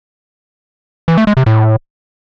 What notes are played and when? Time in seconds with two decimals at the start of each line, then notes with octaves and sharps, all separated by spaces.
1.08 E3
1.18 A3
1.27 G#3
1.37 C3
1.46 A2